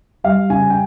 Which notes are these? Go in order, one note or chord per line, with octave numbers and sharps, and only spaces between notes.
G3 F5
C#3 G#5
G5